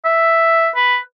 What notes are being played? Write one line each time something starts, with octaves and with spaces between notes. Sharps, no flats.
E5
B4